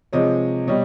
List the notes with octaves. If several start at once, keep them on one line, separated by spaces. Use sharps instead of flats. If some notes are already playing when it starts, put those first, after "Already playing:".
C3 F3 G#3 C#5 D#5
B2 G3 C#5 D#5